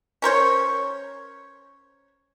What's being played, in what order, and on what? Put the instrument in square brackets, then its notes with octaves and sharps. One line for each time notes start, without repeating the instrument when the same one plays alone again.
[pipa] C#4 A#4 C5 C#5